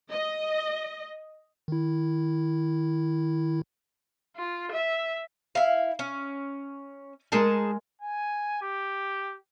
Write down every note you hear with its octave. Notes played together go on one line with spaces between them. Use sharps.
D#5
D#3 E4
F4
E5
E4 F5
C#4
G#3 D#4 G#4 A#4 G#5 A5
G#5
G4